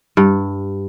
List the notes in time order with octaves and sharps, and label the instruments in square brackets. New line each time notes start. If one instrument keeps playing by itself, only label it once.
[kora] G2